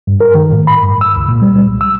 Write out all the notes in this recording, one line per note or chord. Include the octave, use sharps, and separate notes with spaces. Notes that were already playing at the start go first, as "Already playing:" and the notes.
G2
A#4
D#3
A2
B5
G2
E6
C#2
A#2
G3
C2
E6